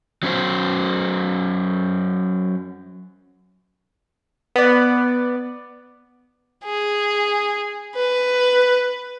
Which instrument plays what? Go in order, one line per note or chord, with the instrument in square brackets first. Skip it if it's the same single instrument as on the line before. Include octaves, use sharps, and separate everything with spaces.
[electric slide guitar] F#3 C#4 C5
[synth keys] B3 D5
[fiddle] G#4
B4